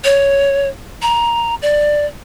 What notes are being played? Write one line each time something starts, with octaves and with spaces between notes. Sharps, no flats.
C#5
A#5
D5